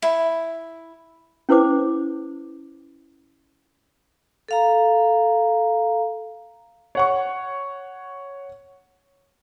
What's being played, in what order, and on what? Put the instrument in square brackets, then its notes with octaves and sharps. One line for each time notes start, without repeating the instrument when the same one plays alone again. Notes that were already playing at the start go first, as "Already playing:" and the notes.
[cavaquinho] E4
[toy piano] C#4 E4 B4 C5 D6
[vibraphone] A4 F5 A#5
[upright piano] C#5 F#5 C#6